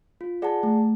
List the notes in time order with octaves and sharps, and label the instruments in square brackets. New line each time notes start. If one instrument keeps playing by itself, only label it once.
[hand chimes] F4
G#4 D5 F#5 A5
A3